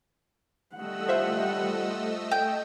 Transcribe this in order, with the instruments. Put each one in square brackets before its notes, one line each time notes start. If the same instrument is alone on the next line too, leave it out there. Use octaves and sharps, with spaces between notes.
[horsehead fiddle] G3 F#5 [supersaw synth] A3 D#5 E6
[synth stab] F4 C5 E5
[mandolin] G5